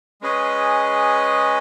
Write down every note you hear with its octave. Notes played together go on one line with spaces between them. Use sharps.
G#3 C#4 G#4 B4 D#5